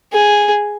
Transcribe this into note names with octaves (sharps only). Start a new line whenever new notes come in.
G#4